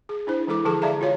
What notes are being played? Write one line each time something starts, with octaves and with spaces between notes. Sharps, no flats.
G#4
D4 E4 C5
E3 G#3 E4 A4 D6
D3 F3 G#4 A4 A5
G#4 D5 E5 F5 A5 A#5
F4 F#4 C#5 F5